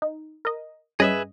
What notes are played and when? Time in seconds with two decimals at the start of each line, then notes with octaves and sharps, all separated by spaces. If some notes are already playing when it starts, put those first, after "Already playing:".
0.02 D#4
0.45 A#4 D#5
1.00 G2 C#4 G#4 B4 D#5 E5